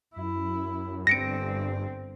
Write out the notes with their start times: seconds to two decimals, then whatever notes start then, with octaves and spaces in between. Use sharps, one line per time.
0.16 F#2 E4
1.07 G1 G2 C4 A#6 C#7 D7